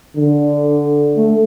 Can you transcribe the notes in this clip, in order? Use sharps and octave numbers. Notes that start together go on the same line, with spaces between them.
D3
A3